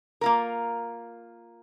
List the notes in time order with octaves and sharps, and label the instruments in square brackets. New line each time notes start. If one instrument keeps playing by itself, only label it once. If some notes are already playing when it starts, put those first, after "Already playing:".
[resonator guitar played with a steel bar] A#3 F4 A#4